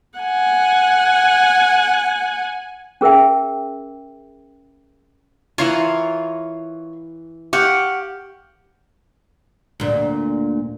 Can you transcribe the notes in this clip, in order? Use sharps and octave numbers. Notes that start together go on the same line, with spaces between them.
F#5 G#5
C#4 G#4 A#4 E5 G5
E3 F4 A#4 C#5 C6
G4 F5 F#5 C#6
D2 A#2